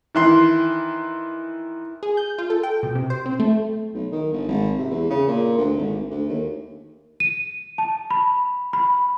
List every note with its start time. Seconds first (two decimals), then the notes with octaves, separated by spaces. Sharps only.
0.15 D#3 E3 C6
2.03 G#4
2.17 G6
2.38 F4
2.50 A4
2.63 G5
2.83 B2
2.95 C3
3.10 C5
3.26 C4
3.39 A3
3.94 B1
4.12 D#3
4.32 G1
4.48 G#1
4.79 C3
4.90 E2
5.10 C#3
5.27 A#2
5.58 D2
5.77 G#1
6.10 D2
6.29 D#2
7.20 D#7
7.78 A5
8.11 B5
8.73 B5